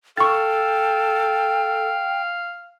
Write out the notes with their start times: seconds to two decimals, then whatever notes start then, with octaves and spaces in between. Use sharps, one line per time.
0.17 A4 F5 G5 C#6 A6